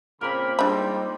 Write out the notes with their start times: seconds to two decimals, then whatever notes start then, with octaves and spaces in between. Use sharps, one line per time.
0.21 A#2 C#3 A#3 C4 A#4 B5
0.59 G3 G#3 C4 D4 D#4 B5